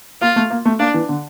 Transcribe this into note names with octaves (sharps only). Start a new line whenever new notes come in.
A#3 F4
A3
A#3
A3
A#3 D4
E3
D3